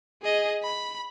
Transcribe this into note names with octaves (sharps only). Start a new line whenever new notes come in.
G#4 D#5
B5